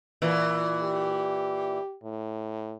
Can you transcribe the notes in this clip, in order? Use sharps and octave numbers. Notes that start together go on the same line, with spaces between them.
A#2 E3
G4
A2